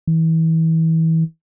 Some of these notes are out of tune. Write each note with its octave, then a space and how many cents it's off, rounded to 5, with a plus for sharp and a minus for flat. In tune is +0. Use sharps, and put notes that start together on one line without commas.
E3 -30